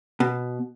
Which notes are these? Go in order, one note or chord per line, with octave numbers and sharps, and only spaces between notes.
B2